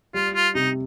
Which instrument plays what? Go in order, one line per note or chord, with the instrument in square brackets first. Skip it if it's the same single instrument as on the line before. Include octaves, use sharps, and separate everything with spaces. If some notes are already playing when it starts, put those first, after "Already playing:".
[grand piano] G3 [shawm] F4
[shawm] F4
[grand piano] C3 [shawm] D#4